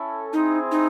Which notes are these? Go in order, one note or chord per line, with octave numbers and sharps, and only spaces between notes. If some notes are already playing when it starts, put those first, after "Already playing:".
Already playing: C#4 E4 A4
C4 D#4 E4 G#4 C5
D#4